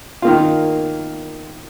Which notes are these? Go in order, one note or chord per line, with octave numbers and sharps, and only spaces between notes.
D#3 A#3 F4